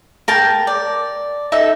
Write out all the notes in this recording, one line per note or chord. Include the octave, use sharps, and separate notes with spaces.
A#4 G5 A5
D5
D#4 A4 E5